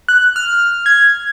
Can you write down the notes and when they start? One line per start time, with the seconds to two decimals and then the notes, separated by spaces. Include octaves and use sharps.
0.09 F#6
0.36 F6
0.86 G#6